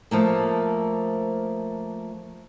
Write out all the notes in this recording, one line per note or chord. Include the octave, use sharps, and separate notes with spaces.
F3 A3 A#3